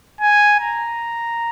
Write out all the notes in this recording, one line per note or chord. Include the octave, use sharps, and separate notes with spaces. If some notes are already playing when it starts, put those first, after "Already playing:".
G#5
A#5